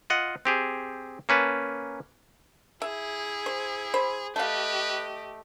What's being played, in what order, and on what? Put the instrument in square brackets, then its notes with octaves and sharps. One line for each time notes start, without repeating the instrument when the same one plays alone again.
[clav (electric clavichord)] F4 D#5 F#5
C4 G4 G#4
A#3 C#4 B4 A5
[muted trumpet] E4 [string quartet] G#4 [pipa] E5
[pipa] C5
C5 B5
[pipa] A3 F5 [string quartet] G4 D#5 [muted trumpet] B4